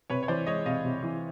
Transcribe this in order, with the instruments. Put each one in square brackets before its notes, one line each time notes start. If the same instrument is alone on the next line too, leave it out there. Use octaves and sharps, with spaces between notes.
[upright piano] C3 [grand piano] B4 C#5
[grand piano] C#5
[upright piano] E3 [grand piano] C5 D5
[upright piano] G#3 [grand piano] C#5 D#5
[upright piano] C3 [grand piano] D#5 F5
[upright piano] C3
E3